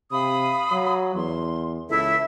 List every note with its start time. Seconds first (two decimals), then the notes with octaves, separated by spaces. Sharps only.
0.12 C3 F5 B5 D#6
0.71 F#3
1.15 E2 C6
1.89 C#2 E4 A4 E5